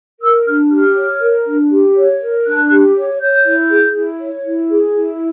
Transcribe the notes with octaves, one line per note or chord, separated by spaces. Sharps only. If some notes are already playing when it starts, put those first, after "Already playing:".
A#4 E6
D4 F6
G4 F6
C#5
A#4
D4
G4
C#5
A#4
D4 F#6
G4
C#5
C#5 G6
E4
G#4
E4
C#5
E4
G#4
E4